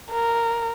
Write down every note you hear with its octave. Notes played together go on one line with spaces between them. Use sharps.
A#4